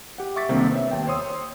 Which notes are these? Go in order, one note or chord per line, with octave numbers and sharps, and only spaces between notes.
G4 F#5
E5 C#6 D6 A6 B6
C2 D3 D#3 A#3 C4
B3 C#5 E5
D#2 G5
C5 C#5 C6 D#6 E6